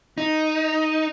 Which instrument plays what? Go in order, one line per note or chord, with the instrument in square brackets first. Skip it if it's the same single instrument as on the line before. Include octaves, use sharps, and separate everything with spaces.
[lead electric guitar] D#4